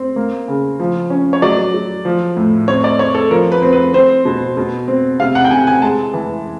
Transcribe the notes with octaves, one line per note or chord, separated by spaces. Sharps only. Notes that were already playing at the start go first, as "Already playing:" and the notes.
Already playing: C4
A#3
C#3
F3
C#4
C#5
F#3 D5
F#3
F3
A2
C4 C#5
D5
C4 C#5
A4
F3 A#4
B4
C4
B4
C4 C5
B2
B2
C4
C3 F5
F#5
G5
C3 G#5
G#5
G#3 A5
E3